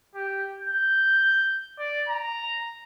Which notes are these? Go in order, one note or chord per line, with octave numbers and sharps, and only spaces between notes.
G4
G6
D5
A#5